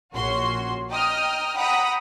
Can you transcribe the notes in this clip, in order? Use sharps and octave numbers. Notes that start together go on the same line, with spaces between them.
A#1 C#4 F#4 C6
D#5 G5 A#5 D#6 F6
F#5 G5 A#5 B5 D#6